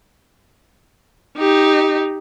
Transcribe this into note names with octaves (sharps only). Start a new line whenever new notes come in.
D#4 G4